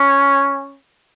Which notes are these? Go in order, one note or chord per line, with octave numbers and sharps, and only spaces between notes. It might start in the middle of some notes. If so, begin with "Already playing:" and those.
Already playing: C#4